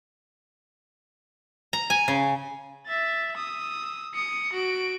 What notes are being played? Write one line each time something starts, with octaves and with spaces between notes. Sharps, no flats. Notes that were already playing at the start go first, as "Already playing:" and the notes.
A#5
G#5
C#3
E5 A6
D#6 E6
D#6 C#7
F#4 D7